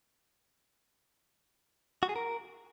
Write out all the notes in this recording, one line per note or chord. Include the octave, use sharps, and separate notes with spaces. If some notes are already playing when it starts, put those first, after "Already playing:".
F#4
G#4
A#4